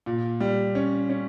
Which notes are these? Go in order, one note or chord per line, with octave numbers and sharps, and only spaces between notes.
A#2
G3
C#4
C#4